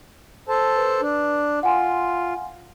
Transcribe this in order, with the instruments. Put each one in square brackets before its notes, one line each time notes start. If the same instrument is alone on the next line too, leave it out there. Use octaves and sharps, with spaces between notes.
[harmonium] A4 C5 A5
[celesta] B4
[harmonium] D4
[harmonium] F4 [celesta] F#5 G#5 C6